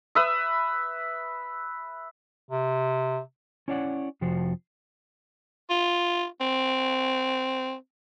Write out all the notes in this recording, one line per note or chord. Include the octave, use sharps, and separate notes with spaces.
B4 E5 D#6
C3
C#4 E4 C#5 D5 F5 F#5
F2 C3 F3 F#4 C5
F4
C4